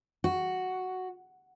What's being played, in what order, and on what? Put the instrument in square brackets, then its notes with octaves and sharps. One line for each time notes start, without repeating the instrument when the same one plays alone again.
[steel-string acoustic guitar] F#4